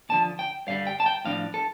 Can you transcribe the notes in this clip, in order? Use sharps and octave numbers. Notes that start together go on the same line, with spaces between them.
D2 D3 F3 A5
G5
G2 D3 G3 F5
G5
A5
G5
A2 F3 D4 F5
A4